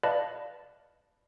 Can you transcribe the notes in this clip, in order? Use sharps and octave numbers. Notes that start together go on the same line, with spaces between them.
B4 D5 D#5 F5 A5 B5